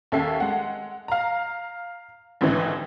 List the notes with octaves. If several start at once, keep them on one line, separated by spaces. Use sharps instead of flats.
D#2 C#4 A4 E5 C7
G#3 F#5
F5 A#5
A1 G#2 D3 E3